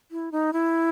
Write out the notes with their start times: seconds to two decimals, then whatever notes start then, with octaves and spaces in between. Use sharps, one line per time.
0.11 E4
0.32 D#4
0.53 E4